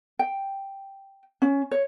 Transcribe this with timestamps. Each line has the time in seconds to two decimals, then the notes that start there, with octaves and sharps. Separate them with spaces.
0.19 G5
1.42 C#4
1.71 C#5